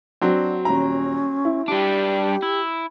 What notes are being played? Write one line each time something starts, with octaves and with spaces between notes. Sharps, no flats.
F#3 C4 D4 F#4
D#1 C#4 A#5
E4
G3 D4 G4
E4